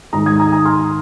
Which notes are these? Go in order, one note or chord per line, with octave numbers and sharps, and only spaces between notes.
G#2 D#3 G#3 A#5 D#6
D#6 G#6
A#5 D#6
A#5 D#6
C6 F6